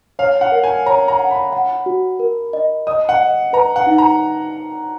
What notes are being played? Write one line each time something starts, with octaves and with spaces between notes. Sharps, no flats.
C#5 F5
F#5
A#4
G#5
C#5 A#5
A#5
F#5
B5
F#5
F#4
A#4
D#5
D#5 D#6
F#5
D#5
B4 A#5
F#5
D#4
A#5